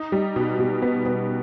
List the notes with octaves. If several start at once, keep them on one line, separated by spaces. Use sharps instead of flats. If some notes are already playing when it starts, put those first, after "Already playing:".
Already playing: D#4
G3
B2
B2
B3
B3